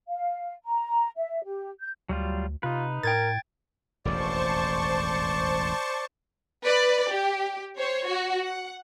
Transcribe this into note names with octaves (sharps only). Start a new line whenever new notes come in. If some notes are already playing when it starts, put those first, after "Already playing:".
F5
A#5
E5
G4
G6
D2 F#3 G3 F4
C3 D#4 F4 B4
A2 A#4 G5 G#6 A6
E1 A1 F2 C5 D5 A5 C#6
B4 D5
G4
C5 C#5
F#4
F#5